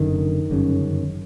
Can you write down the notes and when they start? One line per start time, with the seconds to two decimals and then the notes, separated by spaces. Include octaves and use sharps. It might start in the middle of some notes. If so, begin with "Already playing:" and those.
Already playing: F#1 F#2 D3 D#3
0.51 G1 F#2 C#3